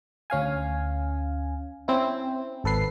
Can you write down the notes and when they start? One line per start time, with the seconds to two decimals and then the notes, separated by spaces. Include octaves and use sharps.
0.30 D2 C#4 F5 G#5
1.88 C4 C#4 E4
2.64 G#1 A4 B4 C7